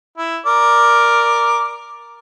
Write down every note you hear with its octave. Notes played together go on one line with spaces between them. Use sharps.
E4
A#4 D5 D6